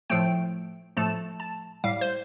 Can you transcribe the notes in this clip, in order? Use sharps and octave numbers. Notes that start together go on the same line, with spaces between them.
A2 F3 A3 G5
A2 F3 A3 A5
A5
A2 G3 F5
C5